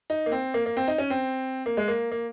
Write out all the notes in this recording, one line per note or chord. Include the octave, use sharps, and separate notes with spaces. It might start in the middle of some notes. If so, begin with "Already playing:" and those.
D#4
A#3
C4
A#3
A#3
C4
D#4
C#4
C4
A#3
G#3
A#3
A#3